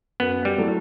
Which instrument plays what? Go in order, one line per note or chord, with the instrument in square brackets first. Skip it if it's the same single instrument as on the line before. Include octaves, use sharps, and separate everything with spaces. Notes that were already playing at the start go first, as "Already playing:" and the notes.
[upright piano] F#2 [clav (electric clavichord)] B3
[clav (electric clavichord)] G3
[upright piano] F#3 A3 E4